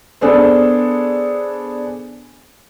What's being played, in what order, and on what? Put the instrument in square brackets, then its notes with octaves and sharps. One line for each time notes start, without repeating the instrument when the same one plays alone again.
[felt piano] B3 D4 G#4 A4 C5